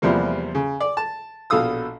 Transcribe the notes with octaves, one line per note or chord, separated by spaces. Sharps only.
E2 C3 F3 G3 A#3
C#3
D5
A5
A#1 B2 A4 F5 D#6 E6